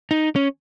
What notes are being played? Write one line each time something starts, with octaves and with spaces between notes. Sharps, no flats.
D#4
C#4